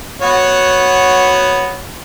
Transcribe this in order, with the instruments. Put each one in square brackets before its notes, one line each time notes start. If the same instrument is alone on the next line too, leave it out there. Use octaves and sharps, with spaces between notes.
[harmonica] B3 F#4 C#5